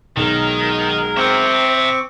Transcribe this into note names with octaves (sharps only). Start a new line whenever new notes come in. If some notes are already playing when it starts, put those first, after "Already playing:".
B1 D#3 F#3 G#3 A#4
C4 E5 G5 C#6 D6